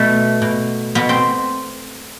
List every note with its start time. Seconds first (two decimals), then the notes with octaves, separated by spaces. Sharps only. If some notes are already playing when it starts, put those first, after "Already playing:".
Already playing: B2 A3
0.42 B2
0.95 B2 B3
1.09 C4